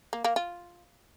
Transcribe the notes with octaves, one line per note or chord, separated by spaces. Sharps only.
A#3
A#3
F4